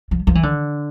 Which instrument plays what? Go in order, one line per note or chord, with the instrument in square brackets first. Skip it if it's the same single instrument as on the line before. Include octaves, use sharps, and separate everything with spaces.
[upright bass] F3
F3
E3
D3